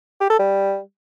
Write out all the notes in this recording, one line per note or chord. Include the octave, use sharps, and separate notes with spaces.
G4
A4
G3